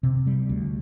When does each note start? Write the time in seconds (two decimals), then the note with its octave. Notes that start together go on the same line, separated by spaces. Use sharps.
0.03 C3
0.27 G3
0.49 D2